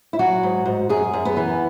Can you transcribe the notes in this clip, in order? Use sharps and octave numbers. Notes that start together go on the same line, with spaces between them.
E4
F#3 F#4
G#2
G#2
F#2 G#4
F#2
B3
E3